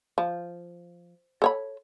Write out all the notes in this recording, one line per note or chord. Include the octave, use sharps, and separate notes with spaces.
F3
A4 C#5 B5